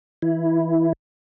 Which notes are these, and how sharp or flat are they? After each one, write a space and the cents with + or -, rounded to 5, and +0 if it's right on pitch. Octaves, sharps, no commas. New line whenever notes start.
E3 -20 E4 +0